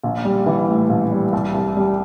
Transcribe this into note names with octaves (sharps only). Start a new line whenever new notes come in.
A#1
G3
E3
A2
A#1
G3
C2
C2
G3